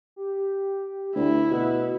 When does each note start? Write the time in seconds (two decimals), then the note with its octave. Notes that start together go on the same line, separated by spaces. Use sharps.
0.16 G4
1.16 D2 E4
1.51 B2 F#5